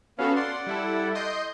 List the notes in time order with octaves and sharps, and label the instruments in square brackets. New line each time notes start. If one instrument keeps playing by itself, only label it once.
[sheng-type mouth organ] B3 F5 [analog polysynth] C#4 F#4 A4
[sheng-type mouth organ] D5 F#5 [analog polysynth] C6
[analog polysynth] G3 E4 A4
D#5 C6 G6